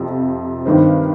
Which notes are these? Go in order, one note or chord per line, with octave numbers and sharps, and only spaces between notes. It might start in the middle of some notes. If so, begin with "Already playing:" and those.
Already playing: F2 C3 F3 C4
G2 D#3 C4